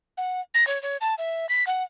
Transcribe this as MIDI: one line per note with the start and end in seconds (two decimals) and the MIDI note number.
0.18 0.41 78
0.54 0.67 94
0.67 0.81 73
0.83 0.97 73
1.01 1.15 81
1.18 1.46 76
1.49 1.64 95
1.67 1.84 78